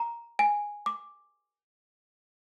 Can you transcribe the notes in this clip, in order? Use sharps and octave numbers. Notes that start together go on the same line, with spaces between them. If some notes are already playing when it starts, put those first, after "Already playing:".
Already playing: A#5
G#5
D6